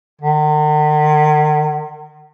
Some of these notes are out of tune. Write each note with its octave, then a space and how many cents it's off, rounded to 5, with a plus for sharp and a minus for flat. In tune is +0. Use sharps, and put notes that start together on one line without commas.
D#3 -45